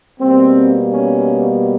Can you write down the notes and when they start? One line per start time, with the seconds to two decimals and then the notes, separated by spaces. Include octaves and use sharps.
0.20 B2 G3 A#3 C4
0.92 C#4